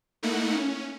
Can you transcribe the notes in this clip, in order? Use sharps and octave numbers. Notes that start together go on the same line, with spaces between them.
A3 A#3 D#4 E4 F#5
C#4